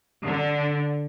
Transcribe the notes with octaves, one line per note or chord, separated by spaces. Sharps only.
D3